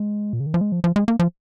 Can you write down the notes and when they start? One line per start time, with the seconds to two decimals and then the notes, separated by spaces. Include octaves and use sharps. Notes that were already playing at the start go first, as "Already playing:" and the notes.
Already playing: G#3
0.33 A#2
0.40 C#3
0.46 D#3
0.54 F3
0.61 G#3
0.72 F3
0.84 F3
0.96 G#3
1.08 A#3
1.19 F3